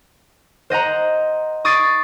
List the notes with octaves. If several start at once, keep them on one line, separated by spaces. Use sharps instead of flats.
C5 D#5 F#5 A#5
C#6 D#6 G#6 A6 C7 D7